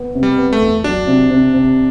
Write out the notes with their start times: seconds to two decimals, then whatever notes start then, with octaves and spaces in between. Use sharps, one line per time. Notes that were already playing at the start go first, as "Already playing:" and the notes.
Already playing: B3
0.15 C3
0.23 G3
0.38 B3
0.53 A3
0.61 E2
0.84 F#3 D4
1.07 C3
1.30 C3
1.54 C3